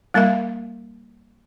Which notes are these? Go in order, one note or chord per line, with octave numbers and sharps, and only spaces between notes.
G3 A#3 A#4 E5 F5